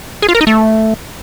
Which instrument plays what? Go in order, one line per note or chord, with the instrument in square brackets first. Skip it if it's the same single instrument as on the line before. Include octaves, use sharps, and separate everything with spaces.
[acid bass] G#4
F4
A#4
D#4
A3